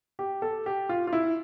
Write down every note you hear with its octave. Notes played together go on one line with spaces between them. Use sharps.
G4
A4
G4
F4
F4
E4